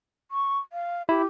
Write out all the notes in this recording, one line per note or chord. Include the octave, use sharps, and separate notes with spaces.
C#6
F5
E4 G4